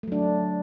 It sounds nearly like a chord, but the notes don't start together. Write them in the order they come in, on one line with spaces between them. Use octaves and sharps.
A3 F#3 D4